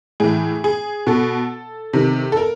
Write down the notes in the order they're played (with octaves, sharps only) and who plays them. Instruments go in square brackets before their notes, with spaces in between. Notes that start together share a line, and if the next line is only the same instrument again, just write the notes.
[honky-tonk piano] A2 E3 G#4
G#4
B2 A4
C3 D#3
A4
A#4